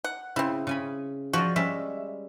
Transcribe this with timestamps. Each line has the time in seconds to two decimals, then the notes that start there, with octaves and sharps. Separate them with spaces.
0.04 F#5
0.36 C#3 C4 E4
0.67 C#3 G#5 B5
1.33 F3 F#4 D5 D#5
1.56 G3 G#3 C#4 E5